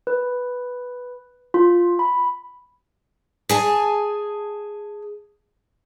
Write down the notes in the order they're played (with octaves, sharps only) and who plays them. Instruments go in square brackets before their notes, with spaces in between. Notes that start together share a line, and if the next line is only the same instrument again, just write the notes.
[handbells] B4
F4
B5
[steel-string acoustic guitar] G#4 G#5 A5